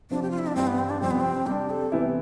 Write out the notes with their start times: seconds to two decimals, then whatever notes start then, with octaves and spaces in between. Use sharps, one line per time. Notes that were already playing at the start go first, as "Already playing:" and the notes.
0.11 C3 F3 C4 D4
0.22 G4
0.31 F4
0.38 E4
0.47 D4
0.55 G2 E3 G3 C4
0.67 B3
0.78 C4
0.90 D4
1.00 F2 C3 G3 C4
1.11 B3
1.20 C4
1.46 C3 G3 D4 G4
1.70 A4
1.92 C3 E3 B3 E4 G4